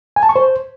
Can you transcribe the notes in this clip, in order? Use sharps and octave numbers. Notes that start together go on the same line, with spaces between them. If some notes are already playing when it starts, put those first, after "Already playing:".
G#5
A5
C#6
C5